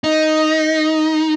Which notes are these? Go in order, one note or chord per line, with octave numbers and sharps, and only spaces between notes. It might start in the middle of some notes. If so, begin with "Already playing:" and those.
D#4